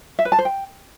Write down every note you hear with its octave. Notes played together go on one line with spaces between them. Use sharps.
E5
B4
A5
C5
G5